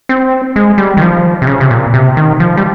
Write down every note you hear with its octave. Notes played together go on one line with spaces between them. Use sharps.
C4
G#3
G3
D#3
F3
C3
C#3
C3
A#2
C3
D#3
F3
G3